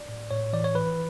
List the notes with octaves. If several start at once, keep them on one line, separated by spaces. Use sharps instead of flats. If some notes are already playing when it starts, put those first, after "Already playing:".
Already playing: D5
A2
A2 C#5
E3 D5
C#5
E3 B4